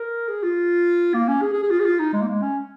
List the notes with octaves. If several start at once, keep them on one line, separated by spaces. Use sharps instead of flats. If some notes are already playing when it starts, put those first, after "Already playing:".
Already playing: A#4
G#4
F4
A#3
C#4
G#4
G#4
G#4
F4
G#4
F4
D#4
G#3
A#3
G#3
C#4